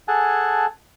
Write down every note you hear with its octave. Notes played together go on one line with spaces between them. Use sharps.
G#4 A4 F#5 G#5 A5